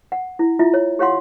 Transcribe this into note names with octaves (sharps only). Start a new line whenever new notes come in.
F#5
E4
E4 F4 E5
C#5
G4 C#5 F5 F#5 C6